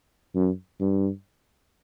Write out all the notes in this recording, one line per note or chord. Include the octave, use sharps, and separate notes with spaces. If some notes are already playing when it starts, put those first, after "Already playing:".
F#2
G2